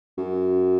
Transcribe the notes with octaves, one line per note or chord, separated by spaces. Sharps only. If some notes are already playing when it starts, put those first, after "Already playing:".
F#2